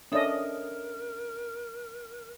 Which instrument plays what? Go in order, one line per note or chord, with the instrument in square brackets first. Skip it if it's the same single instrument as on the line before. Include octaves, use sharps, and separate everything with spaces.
[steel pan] C#4 D4 D#5 [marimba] A4 E5 D#6 [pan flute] A#4